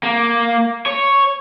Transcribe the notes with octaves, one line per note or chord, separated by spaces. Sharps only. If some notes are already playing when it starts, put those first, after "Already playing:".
A#3
C#5